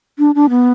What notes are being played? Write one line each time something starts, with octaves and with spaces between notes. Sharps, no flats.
D4
D4
B3